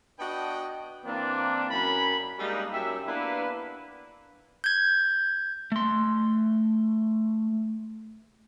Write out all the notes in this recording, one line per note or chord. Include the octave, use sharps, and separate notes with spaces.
B3 D4 F#4 B4 D#5 G5
E3 A#3 C4 D4
F#2 B5
G3 G#3 A#3 D4 D#4
F#2 F#3 G4 E5
A#3 B3 D4 E4 B4
G6 G#6
A3 C6